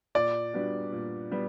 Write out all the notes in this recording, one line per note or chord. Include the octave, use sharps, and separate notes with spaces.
A#2 D5
G3 B3 D4 F#4
A#2
G3 B3